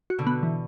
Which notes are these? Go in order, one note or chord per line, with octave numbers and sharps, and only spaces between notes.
F#4
B2 D3
B3
E3